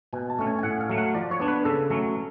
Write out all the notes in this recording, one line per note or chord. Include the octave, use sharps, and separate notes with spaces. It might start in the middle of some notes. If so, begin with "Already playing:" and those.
B2 G#5
A5
A3 C#4
G#5
G#5
A2 F#5
F5
F#3 A3
F#5
F3 D5
C#5
B3 D4
B4
C#3 A4
F#3 A3 C#4